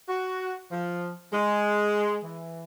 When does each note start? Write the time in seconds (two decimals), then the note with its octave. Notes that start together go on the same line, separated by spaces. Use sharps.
0.07 F#4
0.71 F3
1.31 G#3
2.24 E3